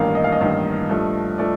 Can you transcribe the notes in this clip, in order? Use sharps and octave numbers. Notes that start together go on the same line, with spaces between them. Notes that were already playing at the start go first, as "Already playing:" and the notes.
Already playing: A1 G2 D#3 A#3 F5
D#5
F5
D#5
A1 G2 D#3 A#3
G2 F3 A3
F3 A3 D5